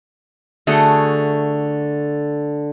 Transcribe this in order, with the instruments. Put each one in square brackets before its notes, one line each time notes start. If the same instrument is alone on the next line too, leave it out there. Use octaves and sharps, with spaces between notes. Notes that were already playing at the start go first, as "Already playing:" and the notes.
[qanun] D3 A3 F#4 G#4